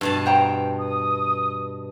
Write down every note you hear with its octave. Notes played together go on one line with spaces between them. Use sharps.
G2 B2 A5
C5 G5 A#5
D#6